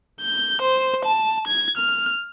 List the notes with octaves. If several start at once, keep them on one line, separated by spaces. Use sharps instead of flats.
G6
C5
A5
G#6
F6